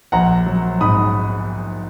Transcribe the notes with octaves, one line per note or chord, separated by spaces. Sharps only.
A#1 F#5 A#5
F#3
G#2 B5 D#6